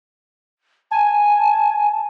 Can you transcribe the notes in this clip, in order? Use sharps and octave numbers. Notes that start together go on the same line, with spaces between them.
G#5 A5